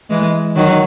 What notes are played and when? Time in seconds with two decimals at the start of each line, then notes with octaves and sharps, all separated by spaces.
0.10 E3 G#3
0.56 D#3 F#3